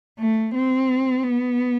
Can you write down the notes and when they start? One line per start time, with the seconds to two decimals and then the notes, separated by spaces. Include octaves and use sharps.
0.19 A3
0.55 C4
1.24 B3